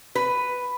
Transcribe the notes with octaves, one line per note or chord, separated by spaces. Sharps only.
B4